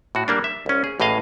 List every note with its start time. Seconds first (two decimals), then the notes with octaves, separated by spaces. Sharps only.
0.15 A2 F#4
0.28 G3 A#3 D4
0.44 E5
0.66 C2 C#4
0.84 G#4
1.00 A1 A2 G#4 D#5 F5